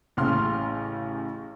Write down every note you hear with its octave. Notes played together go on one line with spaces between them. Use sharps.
A1 C#3 C6 F6